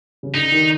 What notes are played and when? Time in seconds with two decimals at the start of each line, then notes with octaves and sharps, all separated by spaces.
0.23 C#3
0.34 D3 D#4
0.52 D#3